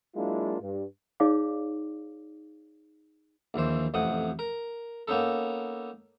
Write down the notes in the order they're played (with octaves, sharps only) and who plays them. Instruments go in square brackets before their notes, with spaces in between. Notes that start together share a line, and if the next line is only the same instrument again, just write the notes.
[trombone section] F#3 G#3 A#3 D4 E4 F4
G2
[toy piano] D#4 G#4 C#5 D5 F5 D6
[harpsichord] A#1 D#2 E3 C5
A1 F2 C3 F#5 D#6
A#4
A#3 B3 C#4 D#4 A4